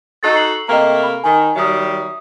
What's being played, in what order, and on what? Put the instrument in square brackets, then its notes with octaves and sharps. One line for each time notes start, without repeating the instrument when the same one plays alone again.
[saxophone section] D#4 F#4 A4 [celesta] D#5 F#6 A6
[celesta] C7 F#7
[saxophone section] C3 A3 A#3 [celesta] D#5 G5 A#5
[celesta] B5
[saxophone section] D#3 [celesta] G#5
[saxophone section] D#3 F#3 G3 [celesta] E5 D#6